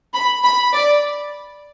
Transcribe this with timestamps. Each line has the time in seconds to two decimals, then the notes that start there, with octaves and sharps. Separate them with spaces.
0.14 B5
0.43 B5
0.73 D5